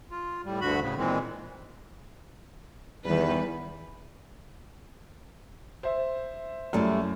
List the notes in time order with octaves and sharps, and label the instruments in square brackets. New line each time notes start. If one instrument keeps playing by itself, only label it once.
[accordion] F4
A2 G3
D2 G2 D3 F#4 B5
A2 C#3
A#2 D#3 E3 G#3 C4
[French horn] E2 [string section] D#3 G3 B4
[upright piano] C5 E5
[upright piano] F#2 [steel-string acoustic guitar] G3 A3 E4